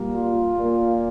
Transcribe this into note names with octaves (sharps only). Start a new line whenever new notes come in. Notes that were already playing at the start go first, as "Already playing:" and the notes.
Already playing: A#2 G3 A#3
F4
A#2 A#3